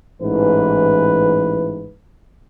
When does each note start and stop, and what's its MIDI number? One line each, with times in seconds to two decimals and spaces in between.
0.22 1.92 33
0.22 1.92 44
0.22 1.92 52
0.22 1.92 71